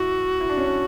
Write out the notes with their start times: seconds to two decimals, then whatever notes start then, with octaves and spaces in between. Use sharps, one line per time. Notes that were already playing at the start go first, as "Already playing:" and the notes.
Already playing: E4 F#4
0.41 E4
0.49 D4
0.57 C#4
0.66 D4